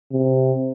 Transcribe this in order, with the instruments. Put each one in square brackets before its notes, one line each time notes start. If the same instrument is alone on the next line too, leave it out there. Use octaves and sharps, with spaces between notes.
[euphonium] C3